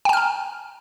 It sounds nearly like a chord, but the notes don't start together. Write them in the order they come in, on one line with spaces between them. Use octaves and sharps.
G5 G#5 F6 A#5